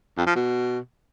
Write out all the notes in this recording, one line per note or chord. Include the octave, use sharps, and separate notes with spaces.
F2
F3
B2